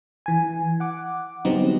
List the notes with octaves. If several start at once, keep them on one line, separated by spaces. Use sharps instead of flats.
E3 G#5
F#5 D6
D3 F#3 G3 B3 C4 D#4